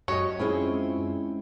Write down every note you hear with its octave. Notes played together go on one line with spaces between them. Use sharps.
F#2 F#4 G4 C#5 D#5
G#3 C4 C#4 E4 F4 G#4